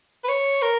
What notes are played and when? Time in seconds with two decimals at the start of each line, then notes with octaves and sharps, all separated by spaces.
0.24 B4
0.29 C#5
0.62 A#4